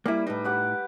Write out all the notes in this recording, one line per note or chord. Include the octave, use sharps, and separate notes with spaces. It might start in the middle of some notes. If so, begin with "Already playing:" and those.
G3 A#3 E4
A2 D#4 B4
G4 F#5 D6